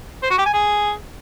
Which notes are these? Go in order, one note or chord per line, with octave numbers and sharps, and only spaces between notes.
C5
F#4
G4
G#5
G#4